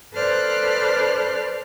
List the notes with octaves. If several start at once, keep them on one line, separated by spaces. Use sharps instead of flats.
A4 B4 C5 D5 F6 F#6